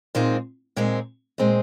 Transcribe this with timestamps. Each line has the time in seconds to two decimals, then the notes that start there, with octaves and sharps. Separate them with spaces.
0.15 A#2 G#3 C4 D#4
0.76 A#2 G#3 C4 D#4
1.38 A#2 G#3 C4 D#4